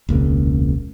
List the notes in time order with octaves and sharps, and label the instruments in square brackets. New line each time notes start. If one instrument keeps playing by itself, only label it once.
[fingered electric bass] E1 C#2 A#2 C#3